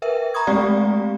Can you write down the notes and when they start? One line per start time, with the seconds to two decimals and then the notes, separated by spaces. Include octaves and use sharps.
0.02 A#4 B4 E5 G5
0.34 A#5 B5 C#6 D#6 G#6
0.47 G#3 A3 C4 G4 D5 F5